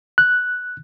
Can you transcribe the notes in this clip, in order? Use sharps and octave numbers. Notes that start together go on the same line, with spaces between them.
F#6